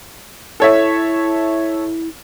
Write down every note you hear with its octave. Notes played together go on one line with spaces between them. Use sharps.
E4 A4 C#5 E5